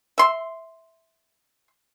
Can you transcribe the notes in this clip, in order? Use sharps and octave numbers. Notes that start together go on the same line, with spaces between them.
E5 C6